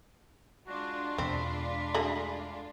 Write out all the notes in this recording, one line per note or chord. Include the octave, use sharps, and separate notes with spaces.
G#3 D4 F4 F#4
E2 B2 C4 B5
A3 F#4 G#4